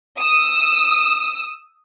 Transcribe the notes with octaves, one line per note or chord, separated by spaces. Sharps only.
D#6 E6